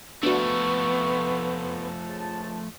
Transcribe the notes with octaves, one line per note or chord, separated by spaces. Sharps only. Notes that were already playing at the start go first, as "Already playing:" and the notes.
F3 A3 B3 D4 F#4 C#6
C#2 A5